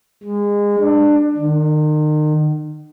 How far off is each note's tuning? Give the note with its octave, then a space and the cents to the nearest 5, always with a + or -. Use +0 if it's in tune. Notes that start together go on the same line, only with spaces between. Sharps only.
G#3 -25
D4 +20
D#3 -35